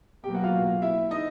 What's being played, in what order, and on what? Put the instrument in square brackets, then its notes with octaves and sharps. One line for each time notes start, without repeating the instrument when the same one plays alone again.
[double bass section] B2 F#3 A#3 [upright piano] G4 G5
[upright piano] F#4 F#5
F4 F5
E4 E5
D#4 D#5